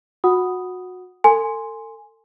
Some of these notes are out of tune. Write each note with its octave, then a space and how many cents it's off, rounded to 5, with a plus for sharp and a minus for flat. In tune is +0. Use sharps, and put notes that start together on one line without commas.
F#4 -25 F#5 +5 D#6 +0
A4 +35 G#5 +0 C6 +0